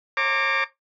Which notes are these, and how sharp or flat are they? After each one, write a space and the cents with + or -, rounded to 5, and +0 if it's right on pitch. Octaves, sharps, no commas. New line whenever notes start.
C#5 -45 A#5 -25 D6 +0